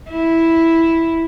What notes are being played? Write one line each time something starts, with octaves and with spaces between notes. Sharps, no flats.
E4